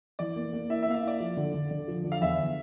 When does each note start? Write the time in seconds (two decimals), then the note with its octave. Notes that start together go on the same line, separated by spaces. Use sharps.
0.19 E3 D5
0.36 A#3
0.53 A#3
0.70 E4 E5
0.83 E5
0.87 A#3 F5
0.95 E5
1.03 E4 D5
1.20 F3
1.37 D3
1.54 D3
1.71 D3
1.88 F3
2.04 D3
2.12 F5
2.21 E2 E5
2.38 D3